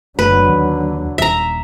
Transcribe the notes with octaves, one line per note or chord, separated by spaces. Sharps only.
F#1 D3 F#3 A3 B4
D#2
D#1 E5 A#5